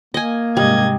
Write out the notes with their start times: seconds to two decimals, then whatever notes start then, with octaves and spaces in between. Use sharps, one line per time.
0.14 A#3 D#5 G#5
0.57 G#2 C3 G3 D#5 G#6